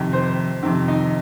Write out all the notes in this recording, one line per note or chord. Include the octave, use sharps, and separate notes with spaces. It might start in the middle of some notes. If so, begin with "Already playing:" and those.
Already playing: F2 C3 D#3
C5
F2 C3 D#3 C4
D#4